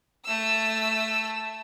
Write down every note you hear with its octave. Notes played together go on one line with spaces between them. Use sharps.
A3 E6